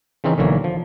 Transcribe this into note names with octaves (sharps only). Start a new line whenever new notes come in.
C#3 E3 C4 C#4 D#4
B1 D3 E3 A#3 C#5
F3